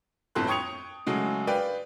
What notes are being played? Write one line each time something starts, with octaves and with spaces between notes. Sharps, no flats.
G1 F2 A2 A4 C6 F#6
G5 C#6 D#6 G#6 C#7 F7
C#3 F#3 G#3 A3
B4 D5 F5 G5 B5